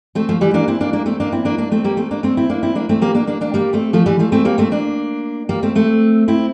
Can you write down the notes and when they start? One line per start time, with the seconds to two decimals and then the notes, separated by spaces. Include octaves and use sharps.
0.15 A3 C4
0.29 F3 A3
0.41 E3 G3
0.54 A#3 D4
0.68 C4 E4
0.80 A#3 D4
0.93 A#3 D4
1.06 A3 C4
1.20 A#3 D4
1.32 C4 E4
1.45 A#3 D4
1.58 A#3 D4
1.71 A3 C4
1.84 G3 A#3
1.97 A3 C4
2.11 A#3 D4
2.23 A3 C4
2.37 C4 E4
2.50 A#3 D4
2.63 C4 E4
2.75 A#3 D4
2.89 A3 C4
3.02 G3 A#3
3.15 A#3 D4
3.27 A#3 D4
3.41 A#3 D4
3.54 G3 A#3
3.73 A3 C4
3.93 F3 A3
4.06 E3 G3
4.19 F3 A3
4.32 A3 C4
4.45 G3 A#3
4.58 A3 C4
4.71 A#3 D4
5.49 G3 A#3
5.63 A3 C4
5.75 A3 C4
6.28 C4 E4